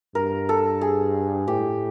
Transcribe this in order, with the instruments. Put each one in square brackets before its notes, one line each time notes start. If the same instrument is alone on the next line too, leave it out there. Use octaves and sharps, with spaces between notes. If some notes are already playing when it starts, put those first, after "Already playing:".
[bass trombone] G2 [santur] A#4
[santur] A4
G#4
[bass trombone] A2 [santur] G4